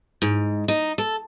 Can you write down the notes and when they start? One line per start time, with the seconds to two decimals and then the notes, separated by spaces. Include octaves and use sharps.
0.22 G#2
0.68 D#4
0.98 A4